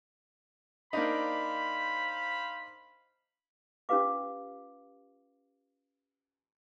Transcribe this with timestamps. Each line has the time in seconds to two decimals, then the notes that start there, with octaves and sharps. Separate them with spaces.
0.93 A#3 D4 D#4 C5 F5 B5
3.89 C#4 F4 G4 B4 F5 D6